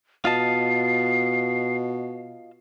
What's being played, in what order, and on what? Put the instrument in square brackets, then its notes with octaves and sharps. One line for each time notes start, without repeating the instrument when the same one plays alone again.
[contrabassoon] B2 [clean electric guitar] F4 D#5 A5 [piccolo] C7